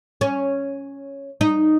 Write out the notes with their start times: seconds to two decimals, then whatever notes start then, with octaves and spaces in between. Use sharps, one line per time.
0.21 C#4
1.41 D#4